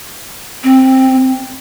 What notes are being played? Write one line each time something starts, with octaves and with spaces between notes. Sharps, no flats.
C4